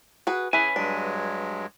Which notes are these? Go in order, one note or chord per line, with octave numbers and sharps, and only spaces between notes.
F#4 G#4 B4
E3 C#4 G#4 B4 G#5
G2 F#3 G#3 D4